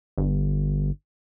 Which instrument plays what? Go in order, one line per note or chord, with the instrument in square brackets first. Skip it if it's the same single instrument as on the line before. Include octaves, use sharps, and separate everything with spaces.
[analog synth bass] G1